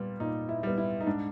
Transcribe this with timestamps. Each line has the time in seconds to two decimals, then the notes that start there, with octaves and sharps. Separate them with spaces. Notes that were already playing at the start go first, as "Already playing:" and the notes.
Already playing: A#2 G3 B3
0.20 A#2 D#4
0.49 E4
0.63 G3 B3
0.78 E4
1.01 D#4
1.06 G#2 D4